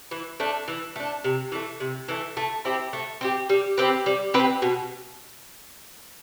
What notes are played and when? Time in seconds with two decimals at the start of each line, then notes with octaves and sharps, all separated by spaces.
0.11 E3
0.40 A3 D4
0.68 E3
0.96 A3 D4
1.24 C3
1.52 E3 A3
1.80 C3
2.08 E3 A3
2.37 A3
2.65 C4 E4 G4
2.93 A3
3.21 C4 E4 G4
3.49 G3
3.78 C4 G4 B4
4.06 G3
4.34 C4 G4 B4
4.62 B2